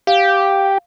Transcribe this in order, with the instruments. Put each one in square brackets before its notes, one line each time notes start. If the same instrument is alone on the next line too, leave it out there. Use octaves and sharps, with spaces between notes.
[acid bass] G4 [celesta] F5